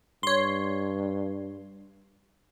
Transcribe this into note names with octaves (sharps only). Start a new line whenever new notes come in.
G2 C#5 C6